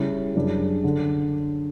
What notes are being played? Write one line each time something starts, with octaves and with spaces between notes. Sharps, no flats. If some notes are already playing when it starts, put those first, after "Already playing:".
Already playing: C#3 G3 C#4 E4
F#2 C#3 G3 D4
D3